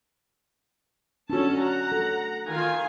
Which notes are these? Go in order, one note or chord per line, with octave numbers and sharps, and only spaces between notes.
C#4 D4 F#4 A4 A5
F#5 A#5
A4
D#3 F4 G#5